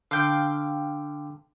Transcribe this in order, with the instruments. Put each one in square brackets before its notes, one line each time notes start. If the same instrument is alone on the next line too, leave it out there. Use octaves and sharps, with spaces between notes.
[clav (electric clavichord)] D3 [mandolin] F5 G5